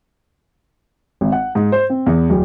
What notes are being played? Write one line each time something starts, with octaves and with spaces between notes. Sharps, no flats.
G#1
F#5
G#2
C5
C4
E2
D1